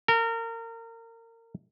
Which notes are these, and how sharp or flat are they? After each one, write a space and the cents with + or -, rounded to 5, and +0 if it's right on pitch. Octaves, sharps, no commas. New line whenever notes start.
A#4 -30